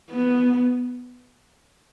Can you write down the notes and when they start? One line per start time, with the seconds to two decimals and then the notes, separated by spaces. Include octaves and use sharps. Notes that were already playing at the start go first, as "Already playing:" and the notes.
0.11 B3